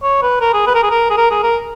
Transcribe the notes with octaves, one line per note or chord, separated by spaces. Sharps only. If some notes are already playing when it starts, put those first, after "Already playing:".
C#5
B4
A#4
G#4
B4
A#4
G#4
A#4
G#4
A#4
G#4
A#4